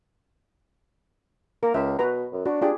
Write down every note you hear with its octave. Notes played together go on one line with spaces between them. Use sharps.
A#3 A#4
C#2 E5
B2 F#4 B4 A#5
F#2
D4 F#4
D4 F4 G4 G#4